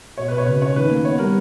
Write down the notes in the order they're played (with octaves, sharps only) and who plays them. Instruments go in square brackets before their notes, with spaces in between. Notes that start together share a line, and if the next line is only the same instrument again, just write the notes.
[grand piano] B2 [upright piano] C#5
[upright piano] B4
[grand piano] B2
[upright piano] C#5
[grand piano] C#3 [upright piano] B4
[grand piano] C#4 [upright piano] C#5
[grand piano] D#3 [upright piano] B4
[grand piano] A#3
[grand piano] B3 [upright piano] C#5
[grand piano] G3 [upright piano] A#4